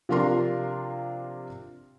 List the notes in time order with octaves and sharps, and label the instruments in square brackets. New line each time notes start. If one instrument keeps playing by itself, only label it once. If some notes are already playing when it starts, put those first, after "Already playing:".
[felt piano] C3 F3 D4 F4 A#4 C6